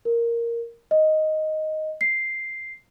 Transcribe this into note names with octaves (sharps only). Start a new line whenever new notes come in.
A#4
D#5
C7